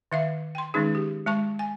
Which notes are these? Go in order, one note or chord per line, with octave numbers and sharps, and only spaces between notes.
D#3 E5 F5
G5 C6
D#3 G#3 C#4 D#4 G#4
G4
G#3 A5 C#6
G#5